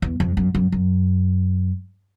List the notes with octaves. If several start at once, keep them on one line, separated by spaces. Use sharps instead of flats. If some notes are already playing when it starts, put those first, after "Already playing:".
E2
F2
F#2
F#2
F#2